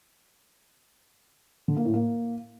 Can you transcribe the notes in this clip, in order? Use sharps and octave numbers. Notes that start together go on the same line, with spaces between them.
D3
A#3
A2
A#3